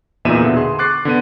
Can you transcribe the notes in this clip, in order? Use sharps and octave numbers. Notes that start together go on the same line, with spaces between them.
E2 A#2 D#4 E5 D#7 E7
B2 D3
G#4 C6
C#6 D6 F#6 A6 C7
D3 B3 D#7